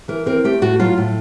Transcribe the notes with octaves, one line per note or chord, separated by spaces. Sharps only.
E3 A#4
C4 A#4
A3 G4
A2 F#4
F#3 F4
A2